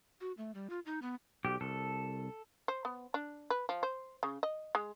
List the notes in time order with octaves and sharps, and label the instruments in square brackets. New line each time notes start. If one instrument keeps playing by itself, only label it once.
[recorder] F#4
A3
G3
F4
D#4
B3
[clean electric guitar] B1 [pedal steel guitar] G4
[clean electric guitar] C2 [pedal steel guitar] A4
[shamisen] C5
B3
D4
B4
F3
C5
C#3
D#5
G#3